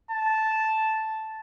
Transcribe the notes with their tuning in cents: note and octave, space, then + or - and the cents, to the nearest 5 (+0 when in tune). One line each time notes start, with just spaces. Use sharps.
A5 -5